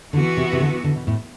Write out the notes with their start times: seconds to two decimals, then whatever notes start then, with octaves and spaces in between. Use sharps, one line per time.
0.13 D3 E3 B3 F#4
0.37 C3
0.53 C3
0.60 D3
0.84 D3
0.96 B2
1.07 A2